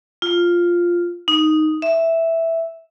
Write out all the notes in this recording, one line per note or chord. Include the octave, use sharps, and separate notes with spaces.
F4
D#4
E5